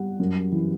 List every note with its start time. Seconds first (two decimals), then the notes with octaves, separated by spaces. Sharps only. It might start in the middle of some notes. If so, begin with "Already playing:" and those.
Already playing: G3 F#5
0.20 F#2
0.52 E3